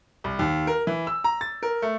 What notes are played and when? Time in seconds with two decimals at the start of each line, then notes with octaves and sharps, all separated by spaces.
0.24 C2
0.39 D#2
0.67 A#4
0.87 E3
1.07 E6
1.24 A#5
1.41 A6
1.63 A#4
1.82 A3